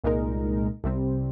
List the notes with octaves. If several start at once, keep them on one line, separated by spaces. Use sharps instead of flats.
C2 A#2 G#3 D#4 A#4
C2 C3 G3 C4